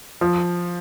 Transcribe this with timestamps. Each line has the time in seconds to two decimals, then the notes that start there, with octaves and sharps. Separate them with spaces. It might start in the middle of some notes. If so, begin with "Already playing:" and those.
0.21 F3